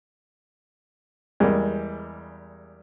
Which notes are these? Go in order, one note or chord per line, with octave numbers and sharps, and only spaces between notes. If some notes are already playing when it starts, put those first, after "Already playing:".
E2 G3 G#3 A#3